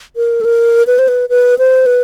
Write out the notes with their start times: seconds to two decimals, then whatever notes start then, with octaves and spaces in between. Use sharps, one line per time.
0.16 A#4
0.41 A4
0.45 A#4
0.87 B4
0.99 C5
1.08 B4
1.29 B4
1.58 C5
1.86 B4